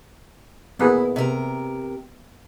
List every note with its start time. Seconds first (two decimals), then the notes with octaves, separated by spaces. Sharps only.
0.79 A#3 B3 E4 G#4
1.16 C3 A#4